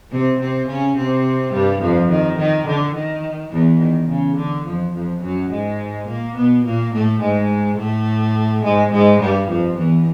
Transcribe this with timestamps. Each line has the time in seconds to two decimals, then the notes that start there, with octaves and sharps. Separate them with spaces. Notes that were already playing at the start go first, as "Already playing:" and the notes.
0.12 C3 C4
0.40 C3 C4
0.68 C#3 C#4
0.97 C3 C4
1.53 G2 G3
1.81 F2 F3
2.11 D#3
2.39 D#3
2.68 D3
2.95 D#3
3.52 E2 E3
3.81 D#3
4.09 C#3
4.37 D3
4.66 F2 F3
4.94 F2 F3
5.23 F#2 F#3
5.52 G#2 G#3
6.08 A#2 A#3
6.36 B2 B3
6.66 A#2 A#3
6.93 A2 A3
7.21 G#2 G#3
7.78 A2 A3
8.64 G#2 G#3
8.92 G#2 G#3
9.20 G2 G3
9.49 F2 F3
9.77 E2 E3